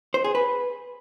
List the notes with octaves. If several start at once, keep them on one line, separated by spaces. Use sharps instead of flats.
C5
G#4
B4